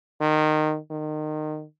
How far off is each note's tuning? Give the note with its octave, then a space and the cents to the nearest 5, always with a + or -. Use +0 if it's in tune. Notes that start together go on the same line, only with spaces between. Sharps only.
D#3 -15
D#3 -25